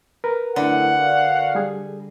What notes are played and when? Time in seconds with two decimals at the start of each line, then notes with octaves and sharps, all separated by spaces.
0.24 A#4 B4
0.56 F#2 D3 A3 E4 F#5
0.98 F#4 D5 F5
1.55 G3 G#4